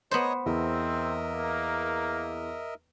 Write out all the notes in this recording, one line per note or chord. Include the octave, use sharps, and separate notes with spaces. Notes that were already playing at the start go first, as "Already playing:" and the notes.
B3 C5 C#5 D#5 A#5
E2 C4 A#4 D#5 E5
A#3